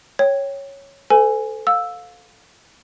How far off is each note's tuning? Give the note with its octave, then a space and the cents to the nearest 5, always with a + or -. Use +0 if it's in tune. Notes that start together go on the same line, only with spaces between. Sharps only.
C#5 -5 G5 +0
A4 +0 C5 -45 G#5 +0
F5 +25 E6 +0